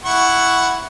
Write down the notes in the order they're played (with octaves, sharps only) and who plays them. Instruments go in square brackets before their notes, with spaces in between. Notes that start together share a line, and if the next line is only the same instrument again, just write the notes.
[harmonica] E4 F#5 C#6